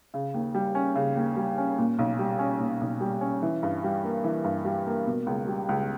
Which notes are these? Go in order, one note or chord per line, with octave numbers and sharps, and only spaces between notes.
C#3
D#2
G3
C#4
C#3
D#2
G3
C#4
A#2
B1
G3
C#4
A#2
B1
G3
C#4
E3
G2
G3
A#3
E3
G2
G3
A#3
B2
C#2
G3
C#2